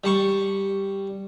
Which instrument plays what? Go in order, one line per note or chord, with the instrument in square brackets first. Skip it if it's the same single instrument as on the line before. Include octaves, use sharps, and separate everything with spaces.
[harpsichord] G3 A5 C#6